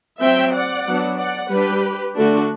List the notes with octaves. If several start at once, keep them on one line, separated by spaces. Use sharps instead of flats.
F#3 C4 E5 G5
D5 F#5
F#3 B3 D4
D5 F#5
G3 D4 G4 B4
D3 A3 D4 F#4 A4